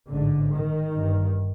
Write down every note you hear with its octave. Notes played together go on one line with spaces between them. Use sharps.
A1 G#2 D3
D#3
G1 G2